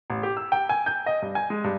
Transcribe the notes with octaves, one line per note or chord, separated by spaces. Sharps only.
A1
G4
E6
G5
G#5
G6
D#5
G2
G#5
G#3
G2